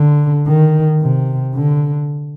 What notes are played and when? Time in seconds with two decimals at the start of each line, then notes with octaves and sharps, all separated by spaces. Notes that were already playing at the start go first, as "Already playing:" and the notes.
Already playing: D3
0.47 D#3
1.01 C3
1.55 D3